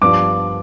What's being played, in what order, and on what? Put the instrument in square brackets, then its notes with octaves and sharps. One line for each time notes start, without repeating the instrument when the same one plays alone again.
[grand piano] G2 F3 B3 D4 [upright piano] D6